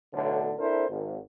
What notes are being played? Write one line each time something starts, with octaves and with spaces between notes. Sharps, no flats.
B1 A2 D3
C4 D4 E4 A4 A#4 C5
G#1